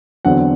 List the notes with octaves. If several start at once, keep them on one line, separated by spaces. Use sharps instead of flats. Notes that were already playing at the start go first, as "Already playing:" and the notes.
E2 D3 F#3 C4 F#5